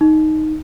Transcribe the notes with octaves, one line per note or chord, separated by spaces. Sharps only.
D#4